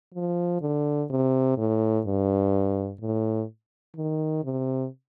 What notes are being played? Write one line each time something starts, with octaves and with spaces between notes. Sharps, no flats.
F3
D3
C3
A2
G2
A2
D#3
C3